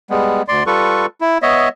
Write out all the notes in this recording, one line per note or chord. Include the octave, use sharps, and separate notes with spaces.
G3 G#3 B3
D2 D5 C6
G3 F4 A4 B4 C#6
E4
B3 C#5 D#5 E5